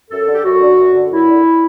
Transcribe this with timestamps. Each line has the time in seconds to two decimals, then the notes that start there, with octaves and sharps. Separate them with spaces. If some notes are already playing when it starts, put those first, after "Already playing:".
0.11 F#2 A4
0.28 D3 G4
0.44 F#2 F#4
0.61 D3
0.78 F#2
0.94 D3
1.11 F#2 E4
1.28 D3